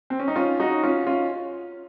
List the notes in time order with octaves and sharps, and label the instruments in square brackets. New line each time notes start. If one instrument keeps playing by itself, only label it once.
[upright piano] C4
C#4
D#4
C#4 F4
D#4 F#4
C#4 F4
C#4 F4